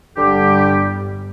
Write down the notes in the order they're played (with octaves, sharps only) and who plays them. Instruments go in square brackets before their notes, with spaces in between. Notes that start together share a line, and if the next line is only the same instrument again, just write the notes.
[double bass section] G1 G3 [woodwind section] D3 G4